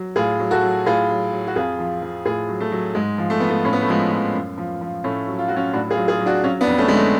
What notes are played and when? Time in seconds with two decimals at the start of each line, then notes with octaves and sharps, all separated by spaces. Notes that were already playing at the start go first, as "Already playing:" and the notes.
Already playing: F#3
0.16 A2 F4 G#4
0.39 F#3
0.51 F#4 A4
0.63 F#3
0.86 A2 F4 G#4
1.09 F#3
1.32 F#3
1.47 F#4
1.55 F2 F4 G#4
1.79 F3
2.02 F3
2.25 A2 F4 G#4
2.48 F#3
2.60 A3
2.72 F#3
2.95 G#2 G#3
3.18 F3
3.30 A3
3.40 F3 B3
3.50 A3
3.64 A2 C#4
3.73 B3
3.81 A3
3.88 F3 G#3 B3
4.11 F3
4.34 F#2
4.58 F3
4.81 F3
5.04 A2 A3 C#4
5.28 F#3
5.39 F4
5.48 F#3 F#4
5.56 C#4 F4
5.73 A2 D4 F#4
5.91 F4 G#4
5.97 F#3
6.08 F4 G#4
6.20 F#3
6.26 D4 F#4
6.43 F#3 C#4 F4
6.61 B3 D4
6.67 F2
6.78 A3 C#4
6.88 D3 G#3
6.96 A3